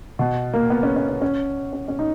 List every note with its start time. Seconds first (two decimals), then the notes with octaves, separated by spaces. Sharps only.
0.19 B2
0.54 A#3
0.70 B3
0.83 C#4
0.96 C#4
1.09 C#4
1.22 C#4
1.73 C#4
1.88 C#4
1.99 D#4